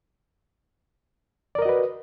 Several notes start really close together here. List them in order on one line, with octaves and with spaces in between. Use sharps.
D5 A#4 D#5 F#4 B4